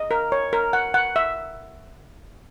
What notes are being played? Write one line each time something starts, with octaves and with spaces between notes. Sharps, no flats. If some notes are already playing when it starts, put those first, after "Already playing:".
Already playing: D#5
A#4
C#5
A#4
F#5
F#5
E5